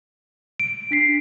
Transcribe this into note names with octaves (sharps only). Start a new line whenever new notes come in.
D7
D4 B6 C7